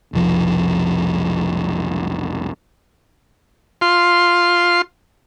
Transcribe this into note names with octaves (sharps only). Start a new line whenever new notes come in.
F1 B1 F3
F4 C6